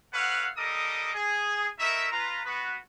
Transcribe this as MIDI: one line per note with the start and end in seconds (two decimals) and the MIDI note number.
0.13 0.47 69
0.13 0.47 71
0.13 0.47 73
0.13 0.47 77
0.13 0.47 78
0.57 1.12 55
0.57 1.12 69
0.57 1.12 70
0.57 1.12 75
0.57 1.12 86
0.57 1.12 87
1.14 1.68 68
1.79 2.10 57
1.79 2.10 63
1.79 2.10 64
1.79 2.10 70
1.79 2.10 76
2.12 2.44 65
2.12 2.44 71
2.12 2.44 82
2.45 2.75 59
2.45 2.75 66
2.45 2.75 71